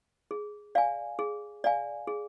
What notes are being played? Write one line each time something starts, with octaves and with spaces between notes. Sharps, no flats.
G#4
D5 F5 G#5
G#4
D5 F5 G#5
G#4